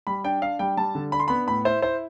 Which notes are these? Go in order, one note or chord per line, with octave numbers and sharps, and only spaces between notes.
G3 B5
D4 G5
D4 F5
G3 G5
G3 A5
D3
D4 B5
C6
B3 B5
A2 B5
E4 C5
E4 C5